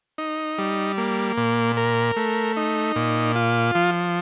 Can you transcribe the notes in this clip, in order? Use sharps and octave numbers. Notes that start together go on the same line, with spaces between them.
D#4
G3
A#3
A#2
A#4
A3
D#4
A#2
F4
F3